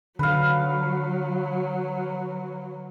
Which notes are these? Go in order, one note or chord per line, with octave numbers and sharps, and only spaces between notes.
D3 F#3 B4 F5